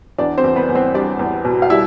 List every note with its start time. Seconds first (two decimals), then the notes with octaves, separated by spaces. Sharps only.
0.18 E2 D4 D5
0.38 C4 C5
0.44 E2
0.56 B3 B4
0.69 E2
0.75 C4 C5
0.94 G3 D4 D5
1.19 E2
1.45 B2
1.62 F5
1.70 G3 E4 E5